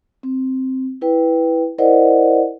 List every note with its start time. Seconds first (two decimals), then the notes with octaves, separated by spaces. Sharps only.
0.23 C4
1.01 E4 B4 G5
1.78 E4 A#4 C5 D5 D#5 F#5